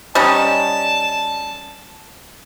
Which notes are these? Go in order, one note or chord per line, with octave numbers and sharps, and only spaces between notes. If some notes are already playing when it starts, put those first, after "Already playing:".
G3 C#4 D#4 A5